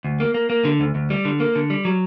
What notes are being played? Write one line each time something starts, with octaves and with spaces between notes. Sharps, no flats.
D2
A#3
A#3
A#3
D3
D2
D2
G3
D3
A#3
D3
G3
F#3